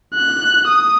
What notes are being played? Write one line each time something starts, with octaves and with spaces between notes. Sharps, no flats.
F#6
D#6